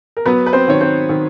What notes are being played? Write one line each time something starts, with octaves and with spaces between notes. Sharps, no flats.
A#4
F#3 B3 B4
B4
C4 C5
D#3 C#5
C4 C5
D#3